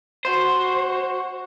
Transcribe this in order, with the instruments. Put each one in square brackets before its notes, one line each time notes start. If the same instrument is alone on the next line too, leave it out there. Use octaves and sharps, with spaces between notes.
[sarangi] F#4 [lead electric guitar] C5